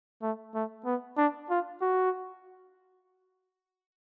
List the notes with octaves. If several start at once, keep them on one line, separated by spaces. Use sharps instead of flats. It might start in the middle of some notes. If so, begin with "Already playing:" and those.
A3
A3
B3
D4
F4
F#4